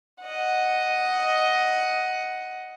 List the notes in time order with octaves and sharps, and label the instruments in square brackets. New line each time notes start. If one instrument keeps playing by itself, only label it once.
[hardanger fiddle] D#5 F#5